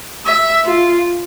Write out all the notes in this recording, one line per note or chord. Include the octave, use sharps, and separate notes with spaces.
E5
F4